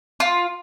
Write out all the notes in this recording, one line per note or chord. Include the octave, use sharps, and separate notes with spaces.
F4